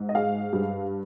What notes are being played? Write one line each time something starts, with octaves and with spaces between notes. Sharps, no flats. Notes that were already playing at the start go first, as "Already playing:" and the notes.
Already playing: G#2
D#5
G#3 F5
G2